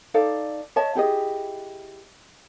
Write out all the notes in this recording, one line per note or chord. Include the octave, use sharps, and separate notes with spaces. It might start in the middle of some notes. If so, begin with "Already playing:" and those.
D#4 A4 D5 F5
C#5 D#5 E5 A5
E4 G4 G#4 D#5